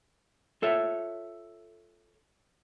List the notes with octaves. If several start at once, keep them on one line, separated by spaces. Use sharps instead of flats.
F4 A4 C#5 E5